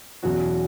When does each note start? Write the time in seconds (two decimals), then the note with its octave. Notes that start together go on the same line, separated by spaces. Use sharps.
0.23 E2 B2 F#3 C#4 F#4